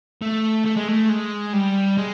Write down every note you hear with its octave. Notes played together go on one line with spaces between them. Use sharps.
A3
A3
G#3
A3
G#3
G3
G#3